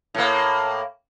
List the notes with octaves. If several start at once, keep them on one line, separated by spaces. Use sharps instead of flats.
A2 A#3